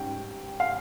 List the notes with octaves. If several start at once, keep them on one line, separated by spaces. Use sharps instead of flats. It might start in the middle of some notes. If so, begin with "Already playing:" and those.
Already playing: G#2 G3 C#4 G5
F5